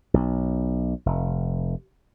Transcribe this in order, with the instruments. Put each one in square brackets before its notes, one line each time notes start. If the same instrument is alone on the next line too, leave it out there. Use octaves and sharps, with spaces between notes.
[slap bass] B1
F1